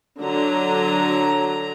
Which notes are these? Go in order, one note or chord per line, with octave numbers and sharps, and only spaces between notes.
D3 F#3 A#5